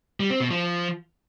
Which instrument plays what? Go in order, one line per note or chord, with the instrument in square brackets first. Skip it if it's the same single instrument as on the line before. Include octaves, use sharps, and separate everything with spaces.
[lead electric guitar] G3
C4
B2
F3